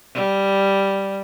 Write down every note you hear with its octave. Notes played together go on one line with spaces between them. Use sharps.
G3